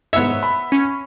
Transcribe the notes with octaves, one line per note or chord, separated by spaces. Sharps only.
G#2 B3 C#5 E5 E6
B5
C#4